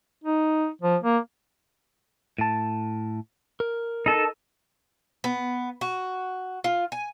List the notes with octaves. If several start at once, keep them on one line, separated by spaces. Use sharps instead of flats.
D#4
F3
A#3
A2 A5
A#4
D#4 A4
B3
F#4
F4
G#5